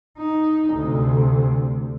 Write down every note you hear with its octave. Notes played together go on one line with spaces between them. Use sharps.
D#4
D2 C3